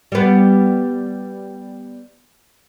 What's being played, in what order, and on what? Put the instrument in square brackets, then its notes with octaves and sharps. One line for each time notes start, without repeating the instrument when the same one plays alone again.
[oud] G3 B3